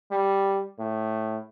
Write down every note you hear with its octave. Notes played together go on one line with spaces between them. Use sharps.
G3
A2